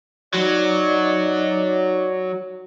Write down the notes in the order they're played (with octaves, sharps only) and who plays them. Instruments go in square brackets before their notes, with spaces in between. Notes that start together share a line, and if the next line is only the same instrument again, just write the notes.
[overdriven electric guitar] F#3 [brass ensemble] D#4 D5